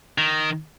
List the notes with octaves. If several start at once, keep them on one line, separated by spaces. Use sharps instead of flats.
D#3